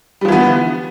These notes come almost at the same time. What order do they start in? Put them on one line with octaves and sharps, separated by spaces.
G3 F3 E3 B3 D3